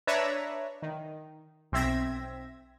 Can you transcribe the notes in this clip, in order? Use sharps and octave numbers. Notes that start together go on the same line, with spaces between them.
D4 B4 C#5 E5 A#5
D#3
B1 C4 E5 G#6 A#6